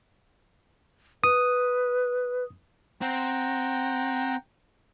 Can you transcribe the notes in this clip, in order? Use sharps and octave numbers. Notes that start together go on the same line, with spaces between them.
B4 D#6
C4 F#5 G5 A#5